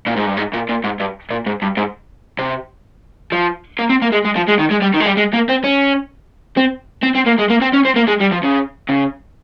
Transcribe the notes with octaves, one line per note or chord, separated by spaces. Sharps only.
A#2
G#2
G2
G#2
A#2
A#2
G#2
G2
A#2
G#2
G2
G#2
C3
F3
A#3
C4
A#3
G#3
G#3
F3
G#3
D#3
G#3
G3
D#3
G#3
G3
G#3
A#3
C4
C#4
C4
C4
C4
A#3
G#3
A#3
C4
C#4
C4
A#3
G#3
G3
F3
C#3
C#3